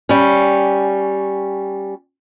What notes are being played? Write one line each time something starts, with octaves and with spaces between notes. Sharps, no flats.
G3 C#4